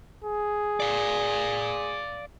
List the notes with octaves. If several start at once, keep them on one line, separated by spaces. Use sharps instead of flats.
G#4
D5 F5